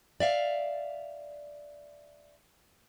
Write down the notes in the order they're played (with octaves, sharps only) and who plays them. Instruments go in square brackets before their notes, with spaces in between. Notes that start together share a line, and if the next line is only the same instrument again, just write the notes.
[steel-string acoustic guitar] D5 E5 F5